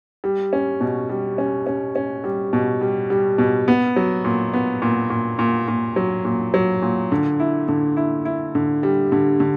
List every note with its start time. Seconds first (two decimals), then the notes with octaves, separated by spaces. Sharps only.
0.24 G3
0.53 C#4
0.81 B2
1.09 G3
1.38 C#4
1.67 C#4
1.96 C#4
2.24 G3
2.53 B2
2.81 G3
3.10 G3
3.38 B2
3.68 B3
3.96 F#3
4.24 A#2
4.54 B3
4.82 A#2
5.10 A#2
5.39 A#2
5.68 A#2
5.96 F#3
6.25 A#2
6.54 F#3
6.82 A#2
7.12 D3
7.40 E4
7.68 D3
7.97 E4
8.25 E4
8.55 D3
8.83 G3
9.12 D3
9.40 D3